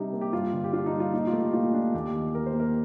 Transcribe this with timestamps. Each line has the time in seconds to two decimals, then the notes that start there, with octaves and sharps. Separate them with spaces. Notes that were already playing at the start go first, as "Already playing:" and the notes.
Already playing: C3 G3 C4 D4 D#4
0.13 A#3
0.21 G4
0.33 G2 F4
0.52 D3
0.64 G4
0.73 D4 F4
0.86 D#4
0.93 G3
1.00 F4
1.13 A#2 D#4
1.27 F4
1.33 A3
1.40 G4
1.53 A#2 F4
1.73 D4
1.94 D#2 G4
2.14 D#3
2.34 D#2 A#4
2.46 C5
2.54 A#3
2.60 A#4